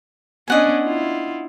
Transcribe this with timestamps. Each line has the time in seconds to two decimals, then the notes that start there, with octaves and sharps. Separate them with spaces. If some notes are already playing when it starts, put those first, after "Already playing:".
0.48 B3 C#4 D4 D#5 F#5 G#5
0.83 E4 F4